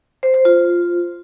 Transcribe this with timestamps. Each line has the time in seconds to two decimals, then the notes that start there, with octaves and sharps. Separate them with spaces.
0.23 C5
0.34 C5
0.45 F4